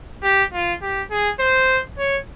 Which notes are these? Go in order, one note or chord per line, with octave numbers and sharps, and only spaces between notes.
G4
F4
G4
G#4
C5
C#5